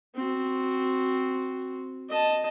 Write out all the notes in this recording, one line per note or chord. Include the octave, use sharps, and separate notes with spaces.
C4 F#4
D#5 A5